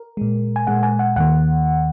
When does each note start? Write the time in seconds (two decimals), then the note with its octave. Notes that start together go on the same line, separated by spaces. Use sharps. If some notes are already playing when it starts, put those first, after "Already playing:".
Already playing: A#4
0.17 A#2 G#3
0.56 G#5
0.67 A#2 G#3 F#5
0.83 G#5
0.99 F#5
1.16 D#2 D#3 A#3 F#5